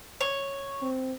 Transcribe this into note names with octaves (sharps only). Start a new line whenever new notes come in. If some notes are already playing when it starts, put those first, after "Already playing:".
C#5
C4